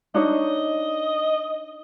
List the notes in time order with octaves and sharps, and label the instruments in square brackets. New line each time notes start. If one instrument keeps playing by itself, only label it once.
[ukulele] D4 D#4 C#5 [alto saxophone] D#5